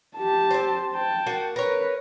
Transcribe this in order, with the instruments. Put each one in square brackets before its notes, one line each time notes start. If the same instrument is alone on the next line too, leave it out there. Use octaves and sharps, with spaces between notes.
[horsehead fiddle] G4 A5
[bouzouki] C4 C5
[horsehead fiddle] G5 A5
[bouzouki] A#3 F#4
[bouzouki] A#4 C#5 [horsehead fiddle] B4